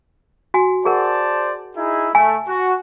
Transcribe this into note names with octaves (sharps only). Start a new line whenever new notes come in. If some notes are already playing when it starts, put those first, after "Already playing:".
F#4 G#5
G#4 A#4 C5 D5 F#5 A5
D#4 E4 G#4
A3 G#5
F#4